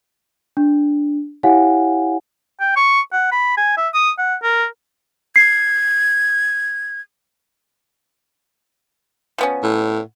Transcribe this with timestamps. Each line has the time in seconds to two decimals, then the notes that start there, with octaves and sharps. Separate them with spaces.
0.57 D4
1.43 E4 G4 C#5 F5 F#5 G#5
2.60 G5
2.76 C#6
3.12 F#5
3.32 B5
3.57 G#5
3.77 E5
3.94 D#6
4.18 F#5
4.43 A#4
5.36 G#6 C7
9.38 F3 B3 C#4
9.63 A2